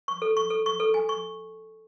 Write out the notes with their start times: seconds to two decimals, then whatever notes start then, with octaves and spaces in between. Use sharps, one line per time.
0.08 C#6
0.22 A4
0.37 C#6
0.50 A4
0.66 C#6
0.80 A4
0.94 G#5
1.09 C#6